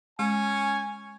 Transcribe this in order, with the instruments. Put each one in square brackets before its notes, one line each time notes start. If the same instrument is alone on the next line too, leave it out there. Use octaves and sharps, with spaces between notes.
[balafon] G#3 [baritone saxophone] C#4 [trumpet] G#5